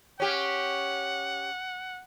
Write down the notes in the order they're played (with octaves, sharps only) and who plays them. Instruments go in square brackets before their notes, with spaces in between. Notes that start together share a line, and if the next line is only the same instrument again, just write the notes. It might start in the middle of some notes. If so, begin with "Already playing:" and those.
[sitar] C#4 G4 [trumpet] F#5